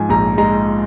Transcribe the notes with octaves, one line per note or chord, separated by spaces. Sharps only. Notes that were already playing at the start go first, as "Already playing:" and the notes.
Already playing: G#2 F3 G#5
A#1 A#5
G#3 A#5